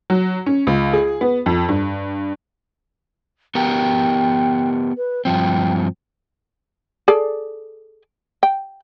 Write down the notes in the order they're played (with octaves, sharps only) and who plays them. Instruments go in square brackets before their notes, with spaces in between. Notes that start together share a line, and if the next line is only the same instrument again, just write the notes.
[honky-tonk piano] F#3
C#4
C#2
G#4
B3
F2
G2
[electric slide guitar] B3 G4 A#4 [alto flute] G5
[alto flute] B4
[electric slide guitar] G2 F3 C4 [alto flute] G5
[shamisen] G#4 A4 D5
G5